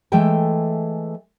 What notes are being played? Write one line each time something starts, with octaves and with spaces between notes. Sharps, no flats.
E3 G#3 A3 A4 G5 A5